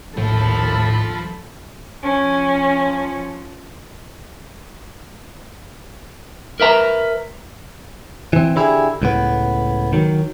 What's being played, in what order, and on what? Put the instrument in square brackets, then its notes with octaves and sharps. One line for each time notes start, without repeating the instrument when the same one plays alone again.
[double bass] A#1 D#2 [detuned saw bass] A2 [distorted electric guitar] F3 [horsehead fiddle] A4 B5
[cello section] F3 [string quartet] C#4
[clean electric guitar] A#4 B4 E5 A#5
E3 C4
D3 E4 G4 G#4
C#2 A2 B3
D#3 F#3